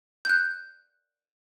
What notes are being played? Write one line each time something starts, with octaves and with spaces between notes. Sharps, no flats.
F#6 G6